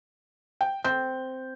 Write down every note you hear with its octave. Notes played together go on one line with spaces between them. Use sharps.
G5
C4 G6